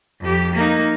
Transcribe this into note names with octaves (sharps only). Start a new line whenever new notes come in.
F2 G4
A#3 D#4